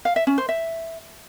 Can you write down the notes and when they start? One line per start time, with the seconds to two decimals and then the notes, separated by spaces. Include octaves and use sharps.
0.05 F5
0.16 E5
0.27 C#4
0.38 C5
0.49 E5